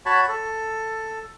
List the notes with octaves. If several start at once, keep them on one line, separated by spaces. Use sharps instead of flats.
F#4 C#5 A5 B5
A4